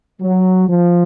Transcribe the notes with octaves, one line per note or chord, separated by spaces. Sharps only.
F#3
F3